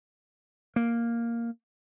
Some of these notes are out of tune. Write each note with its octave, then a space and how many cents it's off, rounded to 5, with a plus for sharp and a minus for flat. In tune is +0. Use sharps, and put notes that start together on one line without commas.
A#3 +0